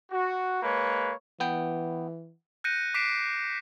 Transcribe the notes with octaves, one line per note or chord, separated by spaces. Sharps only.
F#4
G#3 A#3 B4 C#5
E3 B3 G5
F#6 G6 A#6 C#7 D#7
D6 B6 C7 D7 E7